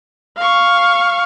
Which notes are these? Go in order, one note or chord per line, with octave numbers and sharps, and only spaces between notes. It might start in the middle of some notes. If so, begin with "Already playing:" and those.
F5 C#6